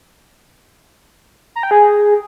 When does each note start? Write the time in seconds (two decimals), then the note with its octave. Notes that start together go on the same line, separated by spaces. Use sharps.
1.56 A#5
1.63 G5
1.71 G#4